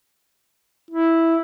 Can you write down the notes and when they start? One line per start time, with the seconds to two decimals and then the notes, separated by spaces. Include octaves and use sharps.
0.91 E4